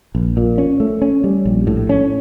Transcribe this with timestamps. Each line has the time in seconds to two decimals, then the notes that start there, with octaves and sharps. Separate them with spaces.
0.15 A#1
0.37 A#2
0.58 C#4
0.80 A3
1.02 C#4
1.24 G3
1.46 A#1
1.67 A2
1.89 C#4